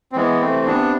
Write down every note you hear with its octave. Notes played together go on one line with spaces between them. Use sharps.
C4
E3 G#3 B3
A3 C4
C3
B3 D4